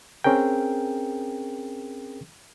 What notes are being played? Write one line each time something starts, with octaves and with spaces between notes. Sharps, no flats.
C4 C#4 G#4 A#4 G5